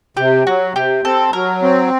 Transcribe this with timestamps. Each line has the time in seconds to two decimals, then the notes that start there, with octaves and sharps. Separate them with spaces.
0.17 C3 G4
0.47 F#3 F#4
0.75 C3 G4
1.04 C4 A4
1.33 F#3 A#4
1.62 C4